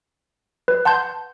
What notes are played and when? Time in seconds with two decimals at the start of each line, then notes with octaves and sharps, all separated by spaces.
0.68 B4
0.85 F#5 A5 C6 G6